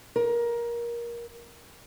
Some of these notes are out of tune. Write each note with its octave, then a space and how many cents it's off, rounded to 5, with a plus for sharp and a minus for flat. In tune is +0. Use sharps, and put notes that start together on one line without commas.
A#4 +20